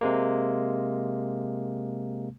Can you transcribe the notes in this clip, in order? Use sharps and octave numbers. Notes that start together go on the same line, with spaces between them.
C3 G#3 A#3